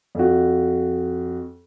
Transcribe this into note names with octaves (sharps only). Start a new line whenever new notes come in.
F2 F#4